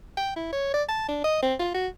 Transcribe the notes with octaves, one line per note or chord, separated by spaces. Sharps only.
G5
E4
C#5
D5
A5
D4
D#5
C4
F4
F#4